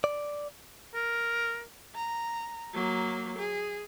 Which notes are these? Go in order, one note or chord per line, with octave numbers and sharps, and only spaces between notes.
D5
A#4
A#5
F#3 A#3
G#4